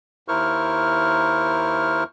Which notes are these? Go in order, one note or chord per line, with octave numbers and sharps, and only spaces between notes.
D#2 E4 A#4 C5 C#6 F6